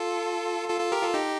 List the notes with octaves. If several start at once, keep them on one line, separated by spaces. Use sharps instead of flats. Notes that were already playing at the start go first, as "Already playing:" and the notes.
Already playing: F4 A4
F4 A4
F4 A4
G4 A#4
F4 A4
D#4 G4